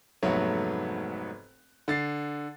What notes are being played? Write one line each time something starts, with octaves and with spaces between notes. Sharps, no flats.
F1 G#2 F#3 A3 B3 C#5
D3 A6 C7